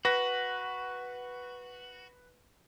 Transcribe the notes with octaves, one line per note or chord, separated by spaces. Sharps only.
F#4 B4 A#6